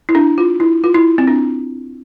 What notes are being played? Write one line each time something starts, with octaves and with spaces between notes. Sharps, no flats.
E4
D4
F4
E4
F4
E4
C4
D4